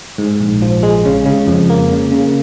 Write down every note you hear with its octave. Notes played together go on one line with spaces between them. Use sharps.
G#2
A#1
F3
G#3
C#3
C#3
F2
A#3
C#3
C#3